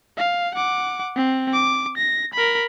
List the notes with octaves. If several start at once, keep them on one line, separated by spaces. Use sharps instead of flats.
F5
F#5 D6
C4
D6
A#6
A#4 B5